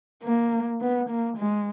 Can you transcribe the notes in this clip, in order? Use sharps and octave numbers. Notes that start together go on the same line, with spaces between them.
A#3
B3
A#3
G#3